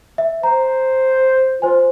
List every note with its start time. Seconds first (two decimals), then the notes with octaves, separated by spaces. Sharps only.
0.18 E5
0.43 C5 A#5
1.62 F4 C5 G#5